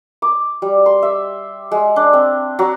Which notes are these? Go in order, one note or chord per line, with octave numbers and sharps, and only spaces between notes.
D6
G3
C6
E5
G#3
D4
C4
F#3